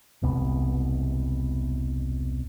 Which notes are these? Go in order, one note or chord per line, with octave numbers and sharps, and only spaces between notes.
E1 C2 B2